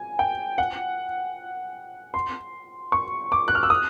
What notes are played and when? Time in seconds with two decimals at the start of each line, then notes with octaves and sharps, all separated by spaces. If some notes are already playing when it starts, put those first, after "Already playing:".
Already playing: G#5
0.19 G5
0.58 F#5
2.14 C6
2.92 C#6
3.32 D6
3.48 F#6
3.55 F6
3.63 E6
3.70 D#6